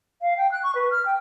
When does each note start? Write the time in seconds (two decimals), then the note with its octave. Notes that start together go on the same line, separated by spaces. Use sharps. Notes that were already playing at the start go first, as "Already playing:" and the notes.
0.22 F5
0.37 G5
0.51 F#6
0.63 C#6
0.75 B4
0.91 F6
1.05 G5